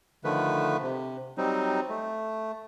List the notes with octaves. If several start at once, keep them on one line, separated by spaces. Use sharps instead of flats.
D3 D#3 F3 A3 B4
C3
F#3 G3 C4 D#4
A3